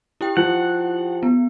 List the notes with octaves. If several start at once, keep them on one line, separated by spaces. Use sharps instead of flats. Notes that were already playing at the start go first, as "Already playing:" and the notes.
E4 G4 G5
F3 F#5
B3